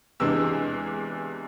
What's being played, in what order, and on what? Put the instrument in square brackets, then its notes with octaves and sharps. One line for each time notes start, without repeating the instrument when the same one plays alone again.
[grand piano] E2 C3 E3 G#3 D4 E6